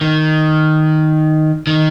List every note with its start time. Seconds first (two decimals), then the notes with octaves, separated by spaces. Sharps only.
0.01 D#3
1.67 D#3